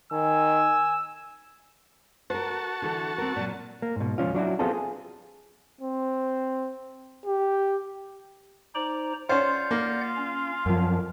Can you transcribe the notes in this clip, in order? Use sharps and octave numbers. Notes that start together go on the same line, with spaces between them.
D#3 G#5 E6
F#4 A#4 C5 A5
D3 E3 A4
C4 A#4
A#2 F#3
A#3
G#2 B2
C#2 F3 C#4 F4
F#3 D4 E4 F#4
B3 C4 F4 G#4 A4
G#4
C4
G4
D#4 C5 D5 A#5
C#4 F4 C5 D5 F#5 G6
A#3
C#4
F#2 F3 A#4